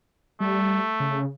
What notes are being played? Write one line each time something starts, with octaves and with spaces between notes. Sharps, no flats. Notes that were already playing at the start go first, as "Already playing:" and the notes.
G3 A3
C#3